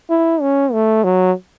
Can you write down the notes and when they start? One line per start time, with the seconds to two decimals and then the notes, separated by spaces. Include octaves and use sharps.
0.10 E4
0.41 C#4
0.73 A3
1.04 F#3